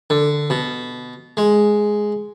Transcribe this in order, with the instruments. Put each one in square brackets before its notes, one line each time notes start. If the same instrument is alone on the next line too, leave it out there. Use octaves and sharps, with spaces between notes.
[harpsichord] D3
B2
G#3